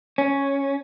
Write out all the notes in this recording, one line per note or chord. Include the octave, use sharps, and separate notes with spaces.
C#4